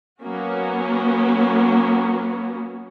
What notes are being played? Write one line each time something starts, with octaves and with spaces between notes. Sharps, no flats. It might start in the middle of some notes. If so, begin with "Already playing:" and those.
F#3 A#3 B3 C#4 F#4